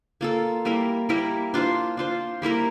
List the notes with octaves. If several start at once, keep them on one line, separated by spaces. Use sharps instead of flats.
A#3 F4 A4
G3 A#3 E4 A#4
G3 A#3 E4 A#4
D4 F4 C5
D4 F4 C5
G3 A#3 E4 A#4